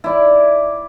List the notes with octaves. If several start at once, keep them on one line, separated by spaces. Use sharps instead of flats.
E4 D5